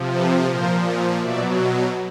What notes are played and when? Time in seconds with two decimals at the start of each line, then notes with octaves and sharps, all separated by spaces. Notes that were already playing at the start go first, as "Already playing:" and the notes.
Already playing: C3 F3
0.12 A4 B4
0.47 A#2 F3 A#4 C5
1.17 B2 F#3 D5 E5